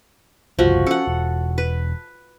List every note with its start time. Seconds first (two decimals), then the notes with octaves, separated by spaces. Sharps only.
0.59 F#1 C2 F3 F#4
0.87 C#4 A4 F#5
1.07 E1
1.58 B4